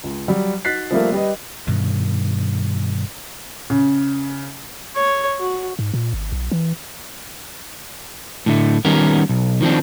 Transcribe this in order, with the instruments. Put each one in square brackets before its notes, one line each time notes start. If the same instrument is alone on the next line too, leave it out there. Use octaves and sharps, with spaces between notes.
[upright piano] C#2
F#3 G3
D#4 F#4 F#6 A6 B6 C7
F3 G3 A3 A#3
G3 G4 B4 D#5
[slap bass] G2 B2 D#3
[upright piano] C#3
[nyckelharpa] C#5
F#4
[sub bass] G#2
A#2
G#1
B1
E3
[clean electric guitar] A2 D3 A3
D#3 G3 B3 C#4 A#4
B1
D#3 F3 G3 C4 D4